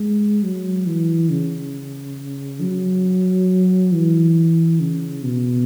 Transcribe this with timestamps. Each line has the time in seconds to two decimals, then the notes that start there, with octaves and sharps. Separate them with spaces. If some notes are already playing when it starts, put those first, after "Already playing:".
Already playing: G#3
0.43 F#3
0.87 E3
1.30 C#3
2.62 F#3
3.93 E3
4.80 C#3
5.24 B2